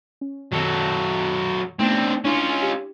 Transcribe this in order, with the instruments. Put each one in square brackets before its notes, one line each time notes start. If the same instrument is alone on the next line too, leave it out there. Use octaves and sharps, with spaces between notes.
[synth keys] C#4
[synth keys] F#2 B2 D#3 [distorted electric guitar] F#3 A4
[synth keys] A3 B3 D#4 [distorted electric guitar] C4 D4
[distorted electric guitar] C#4 F4 [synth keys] D4 E4
[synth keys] G4